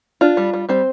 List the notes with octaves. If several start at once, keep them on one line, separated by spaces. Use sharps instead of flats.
D4 F4
G3
G3
G3 C4 C5